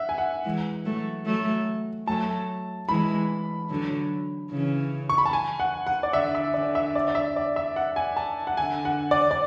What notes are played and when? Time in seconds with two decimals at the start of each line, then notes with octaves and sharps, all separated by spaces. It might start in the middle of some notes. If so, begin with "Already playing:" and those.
Already playing: E5 F#5
0.09 G#5
0.18 F#5
0.45 E3 G#3
0.85 F#3 A3
1.26 F#3 A3
2.07 F#3 A3 A5
2.89 E3 G#3 B5
3.70 D3 F#3
4.51 C#3 E3
5.09 C#6
5.18 B5
5.25 A5
5.33 G#5
5.60 F#5
5.87 F#5
6.03 D5
6.13 D3 E5
6.35 E5
6.54 D3 D5
6.75 E5
6.95 D5
7.08 D5
7.15 E5
7.36 D5
7.56 E5
7.76 F#5
7.96 G#5
8.17 A5
8.47 F#5
8.57 D3 G#5
8.85 F#5
9.11 D5
9.31 D5